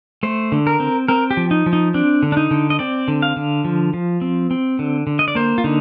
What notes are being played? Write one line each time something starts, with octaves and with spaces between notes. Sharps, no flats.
A3 C5
D3
A#4
C4
C4 A#4
G4
F3
D#4
F3
D#4
C4 D4
D3
D4
D#4
D3
D#5
C4 D5
D3
F5
D3
F3
F3
C4
C4
D3
D3
D#5
D5
A#3 C5
F4
D3 D#4